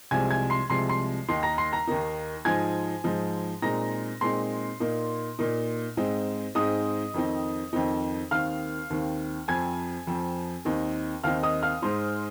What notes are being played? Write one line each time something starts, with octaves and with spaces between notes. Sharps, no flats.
C2 C3 F3 G#3 G#5 G#6
G#5 G#6
C6 C7
C2 C3 F3 G#3 C6 C7
C6 C7
D#2 D#3 A#3 D#4 C6 C7
A#5 A#6
C6 C7
A#5 A#6
D#2 D#3 A#3 D#4
G#2 F3 G#3 D#4 G#5 G#6
G#2 F3 G#3 D#4
A#2 G#3 C4 D#4 A#5 A#6
A#2 G#3 C4 D#4 C6 C7
A#2 A#3 D#4
A#2 A#3 D#4
G#2 G#3 C4 D#4
G#2 G#3 C4 D#4 D#5 D#6
F2 D#3 C4 D#4
F2 D#3 C4 D#4
D#2 D#3 C4 F5 F6
D#2 D#3 C4
F2 F3 C4 G#5 G#6
F2 F3 C4
D#2 D#3 C4 D#4
D#2 D#3 C4 D#4 F5 F6
D#5 D#6
F5 F6
G#2 G#3 D#4 C5 C6